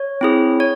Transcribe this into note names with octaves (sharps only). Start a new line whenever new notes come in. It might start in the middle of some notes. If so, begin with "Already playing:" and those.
Already playing: C#5
C4 E4 G#4
C#5